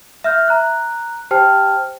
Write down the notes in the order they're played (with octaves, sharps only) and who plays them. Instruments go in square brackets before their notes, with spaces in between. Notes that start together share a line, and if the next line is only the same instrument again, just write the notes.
[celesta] E5 F6 G6
A#5 F#6
G4 C5 G5 A5 F6